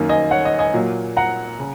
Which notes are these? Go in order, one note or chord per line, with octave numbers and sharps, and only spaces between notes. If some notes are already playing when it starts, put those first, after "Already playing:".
Already playing: F#2 D#3 A#3
D#5 G#5
C#5 F#5
D#5
D#5 G#5
A#2 F#3 A#3
F#5 A#5
C#3